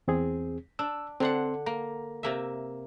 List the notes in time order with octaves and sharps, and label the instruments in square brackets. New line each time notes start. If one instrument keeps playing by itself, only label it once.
[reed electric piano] E2 C4 G#4
[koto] D4 [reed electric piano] E6
[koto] D3 D4 F#5 [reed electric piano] C4 C6
[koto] A#3 [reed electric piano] A#5
[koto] C3 A#3 E5